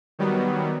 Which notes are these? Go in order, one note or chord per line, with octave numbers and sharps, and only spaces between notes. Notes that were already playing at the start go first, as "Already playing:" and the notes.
D#3 F#3 G3 B3